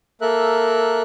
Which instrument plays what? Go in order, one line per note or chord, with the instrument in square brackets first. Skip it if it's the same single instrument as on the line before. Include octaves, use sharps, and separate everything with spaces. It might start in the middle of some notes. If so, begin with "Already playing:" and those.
[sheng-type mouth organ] A#3 A4 A#4 E5 F#6